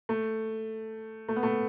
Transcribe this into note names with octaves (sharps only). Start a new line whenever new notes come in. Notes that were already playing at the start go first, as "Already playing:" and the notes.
A3
A3
B3
A3